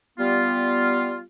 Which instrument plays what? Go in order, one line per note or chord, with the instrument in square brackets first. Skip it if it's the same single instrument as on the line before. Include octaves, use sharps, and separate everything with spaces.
[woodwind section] G3 B3 F4